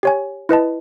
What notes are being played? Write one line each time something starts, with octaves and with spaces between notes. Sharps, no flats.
G4 C#5 G#5
E4 B4 D#5 A5